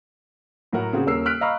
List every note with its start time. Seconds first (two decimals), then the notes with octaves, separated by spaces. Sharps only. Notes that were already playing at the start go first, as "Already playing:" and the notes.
0.73 A2 F#3 F#4 A#4 F#5
0.93 C#3 C4 F#4 G#4
1.06 D#1 C#4 A#4 E6 C7
1.26 F6 F#6 B6 D7
1.41 D#5 F5 A#5 B5 C#6 F6